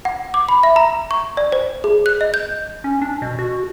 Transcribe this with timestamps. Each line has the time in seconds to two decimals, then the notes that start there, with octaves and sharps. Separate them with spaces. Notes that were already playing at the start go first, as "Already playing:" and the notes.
0.05 F#5
0.34 D6
0.49 B5
0.63 E5
0.76 A#5
1.11 C#6
1.37 D5
1.52 C5
1.84 G#4
2.06 F#6
2.21 D#5
2.34 G6
2.84 C#4
3.02 D4
3.22 B2
3.39 F#4